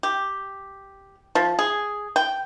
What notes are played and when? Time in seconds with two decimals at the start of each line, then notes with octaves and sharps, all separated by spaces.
0.03 G4
1.35 F3
1.59 G#4
2.16 G5